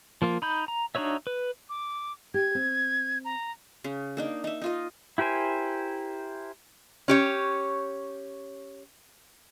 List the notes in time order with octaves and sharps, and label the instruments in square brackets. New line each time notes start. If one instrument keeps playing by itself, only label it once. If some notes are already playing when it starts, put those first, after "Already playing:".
[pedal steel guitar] F3 A#3 F4
D#4 B5 G6
A#5
D4 D#4 F#4 C#5 E5
B4
[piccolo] D6
[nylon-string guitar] G4 [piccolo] G#6
[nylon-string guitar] C4
[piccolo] A#5
[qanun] C#3
A#3 D4 D#4
D#4 E5
D#4 F4 D#5
[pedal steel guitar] E4 G4 A#4 C5 G#5
[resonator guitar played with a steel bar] C#4 G4 C#5